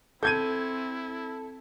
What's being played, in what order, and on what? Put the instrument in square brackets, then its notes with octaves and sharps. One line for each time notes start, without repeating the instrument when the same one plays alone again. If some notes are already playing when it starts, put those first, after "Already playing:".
[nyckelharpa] C4 [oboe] E4 [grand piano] A4 [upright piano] G6 G#6 D#7